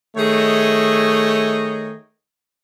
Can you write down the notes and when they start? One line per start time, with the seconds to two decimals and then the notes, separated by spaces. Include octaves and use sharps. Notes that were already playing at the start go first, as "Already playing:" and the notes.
0.17 D#3 A3 G#4 C#5 D#5